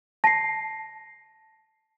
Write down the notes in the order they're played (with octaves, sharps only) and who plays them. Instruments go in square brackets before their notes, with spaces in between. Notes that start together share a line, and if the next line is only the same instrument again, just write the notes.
[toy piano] A5 [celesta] A#6 C7